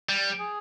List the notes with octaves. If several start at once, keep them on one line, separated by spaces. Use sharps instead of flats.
G3
G#4